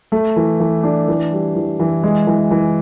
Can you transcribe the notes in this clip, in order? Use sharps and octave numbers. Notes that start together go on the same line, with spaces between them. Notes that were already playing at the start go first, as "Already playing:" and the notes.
A3
E3
E3
D4
E3
G3
E3
E3
G#3
E3
E3